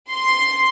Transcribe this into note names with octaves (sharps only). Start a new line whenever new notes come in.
C6